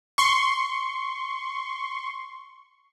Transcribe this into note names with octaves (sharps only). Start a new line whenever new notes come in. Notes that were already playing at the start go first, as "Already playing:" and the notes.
C6 C#6